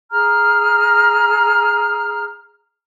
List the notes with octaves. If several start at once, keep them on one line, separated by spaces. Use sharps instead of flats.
G#4 A#5 F6